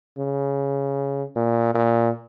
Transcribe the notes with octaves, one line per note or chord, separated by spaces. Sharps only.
C#3
A#2
A#2